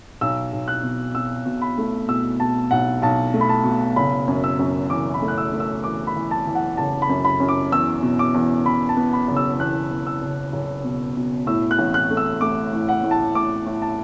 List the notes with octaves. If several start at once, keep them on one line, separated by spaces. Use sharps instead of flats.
B1 E6
B1
F#6
B2
B2 E6
B2
B5
A3
B2 E6
B2 A5
B1 F#5
B1 A5
A3
B5
A5
B2
F#1 B5
F#2
E6
F#2
E3 D6
B5
A3
F#6
E6
A3
E6
E3 D6
B5
E3
A5
E3
F#5
F#1 A5
B5
F#2
B5
F#2
D6
E2 E6
B2
D6
E2
B2 B5
A5
B3
B5
F#1
E6
E2 F#6
E2
E6
F#1
F#1
B2
B2
A2 E6
F#6
A1
F#6
A3
E6
A3 D6
A2
F#5
A2
A5
A2 D6
A2
A5